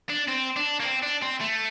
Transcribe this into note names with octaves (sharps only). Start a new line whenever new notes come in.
D4
C4
D4
A#3
C4
D4
C4
A3